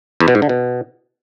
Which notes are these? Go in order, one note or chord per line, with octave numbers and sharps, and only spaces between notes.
E2
B2
G#2
D3
B2